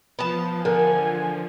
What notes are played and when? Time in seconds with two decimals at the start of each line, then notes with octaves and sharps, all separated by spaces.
0.19 F3 B3 A5
0.65 D3 A#4 G#5